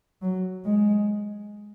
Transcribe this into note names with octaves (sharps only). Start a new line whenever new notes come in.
F#3
G#3